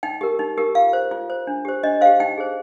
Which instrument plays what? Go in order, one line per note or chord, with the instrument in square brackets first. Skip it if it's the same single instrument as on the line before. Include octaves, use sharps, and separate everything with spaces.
[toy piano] D#4 G5
G4 A#4
D#4
G4 A#4
F4 F5
C5
F4
C5
D4
G4 C5
D4 D#5
G4 C5 F5
D#4 G5
G#4 C5